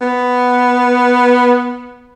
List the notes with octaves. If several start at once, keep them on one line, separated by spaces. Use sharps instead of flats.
B3